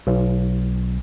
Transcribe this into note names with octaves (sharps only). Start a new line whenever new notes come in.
B1